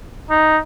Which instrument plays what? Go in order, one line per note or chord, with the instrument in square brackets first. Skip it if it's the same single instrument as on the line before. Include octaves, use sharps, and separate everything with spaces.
[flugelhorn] D#4